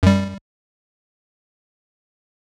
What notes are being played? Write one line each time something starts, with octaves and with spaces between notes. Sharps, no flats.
F#2 G3